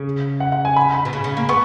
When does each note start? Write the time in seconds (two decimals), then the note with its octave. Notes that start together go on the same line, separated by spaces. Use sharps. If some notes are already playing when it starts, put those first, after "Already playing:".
Already playing: C#3
0.40 F#5
0.52 F#5
0.65 G#5
0.76 B5
0.94 B5
1.05 B2
1.13 C#3
1.24 C#3
1.37 A#3
1.49 B3 C#6